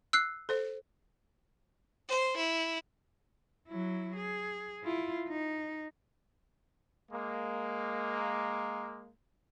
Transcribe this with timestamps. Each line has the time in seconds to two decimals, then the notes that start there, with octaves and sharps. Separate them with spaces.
0.13 E6 F#6 C7
0.49 A4 C5
2.08 C5
2.36 E4
3.68 F#3 E4
4.16 G#4
4.84 E4 F4
5.28 D#4
7.11 G#3 A#3